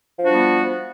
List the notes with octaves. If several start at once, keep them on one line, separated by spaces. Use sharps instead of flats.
F3 G3 B3 D4 F#4